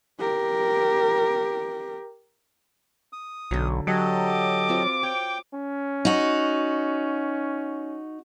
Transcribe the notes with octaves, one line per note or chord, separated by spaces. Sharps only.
G4 A#4
D#6
B1 D3 F#3
F#3 G4 A4 D5 D#5
D6
C4 F4 F#4
C#5 G5
C#4
D#4 F#4